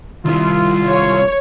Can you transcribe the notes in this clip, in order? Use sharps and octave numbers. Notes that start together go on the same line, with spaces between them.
C2 D#3 G3 E4 F4
C#5